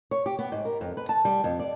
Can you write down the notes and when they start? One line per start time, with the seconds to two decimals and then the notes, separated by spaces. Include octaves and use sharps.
0.11 C#5
0.26 G4
0.39 B3
0.52 G#2
0.65 A#4
0.81 F2
0.97 B4
1.09 A5
1.25 G3
1.44 F2
1.59 D5